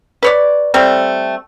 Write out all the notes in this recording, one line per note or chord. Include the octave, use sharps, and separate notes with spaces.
B4 C#5 D5
G3 A3 C4